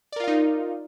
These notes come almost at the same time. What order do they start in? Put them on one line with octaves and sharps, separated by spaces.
D5 A#4 F4 F5 D#4